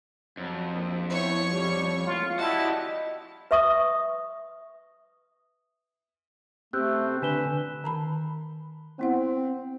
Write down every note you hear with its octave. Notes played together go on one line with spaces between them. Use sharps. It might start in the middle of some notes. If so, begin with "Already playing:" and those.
F2 F#3
A#1
B3 E4 C#5 C#6
B1 G#2 G3
F#1 G#3 A3 F4
E4 F#4 G4 D5 D#5 A5
B4 E5 C#6 D#6
A3 C4 G4 E6 F#6 G6
D3 B4 G#5 E7 G7
D#3 A5 B5
B3 C4 E4 F#5